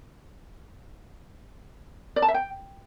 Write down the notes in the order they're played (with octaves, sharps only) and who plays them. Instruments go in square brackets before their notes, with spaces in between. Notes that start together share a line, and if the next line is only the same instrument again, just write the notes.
[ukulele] D5
A5
E5
G5